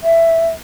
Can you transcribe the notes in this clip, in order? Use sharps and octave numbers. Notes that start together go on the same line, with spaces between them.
E5